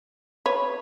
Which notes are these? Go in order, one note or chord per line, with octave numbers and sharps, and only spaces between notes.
B4 C#5